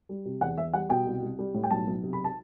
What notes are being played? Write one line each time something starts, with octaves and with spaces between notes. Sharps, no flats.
G3
C3
E2 F#5
E2 E5
G3 F#5
B2 G5
C2
C2
G3
A2
G5
B1 A5
B1
C3
B5
A5